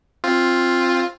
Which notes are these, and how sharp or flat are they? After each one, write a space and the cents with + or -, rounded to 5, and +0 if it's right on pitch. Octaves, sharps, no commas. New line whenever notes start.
C4 +15 F4 +0